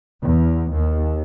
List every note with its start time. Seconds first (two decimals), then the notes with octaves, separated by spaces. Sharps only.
0.22 E2
0.73 D#2